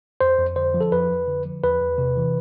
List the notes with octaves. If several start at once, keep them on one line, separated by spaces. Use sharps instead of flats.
F2 C5
F2
D3 C5
F3
A4
F2 B4
F2
D3
F3
E2 B4
E2
C3
E3